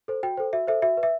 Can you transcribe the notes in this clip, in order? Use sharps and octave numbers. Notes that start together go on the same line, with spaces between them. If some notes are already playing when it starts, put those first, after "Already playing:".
A4 C5
F#4 G5
A4 C5
F#4 E5
A4 C5 E5
F#4 E5
B4
E5